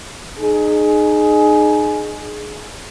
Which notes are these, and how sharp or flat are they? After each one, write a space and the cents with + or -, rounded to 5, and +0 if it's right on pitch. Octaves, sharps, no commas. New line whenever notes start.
D#4 -30 G#4 +15